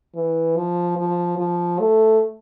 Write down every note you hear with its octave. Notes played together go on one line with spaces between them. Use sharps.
E3
F3
F3
F3
A3